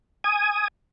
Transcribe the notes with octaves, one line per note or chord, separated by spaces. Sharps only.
G#5 D#6